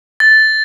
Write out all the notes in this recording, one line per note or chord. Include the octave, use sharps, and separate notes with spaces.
A6